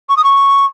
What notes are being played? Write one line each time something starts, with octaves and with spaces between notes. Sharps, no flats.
C#6
D#6
C#6